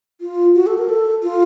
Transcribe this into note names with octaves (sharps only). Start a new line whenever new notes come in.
F4
F#4
A4
A#4
A4
F4